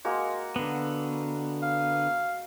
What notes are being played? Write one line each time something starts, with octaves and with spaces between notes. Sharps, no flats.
G#3 A#3 F#4
D3 B3
F5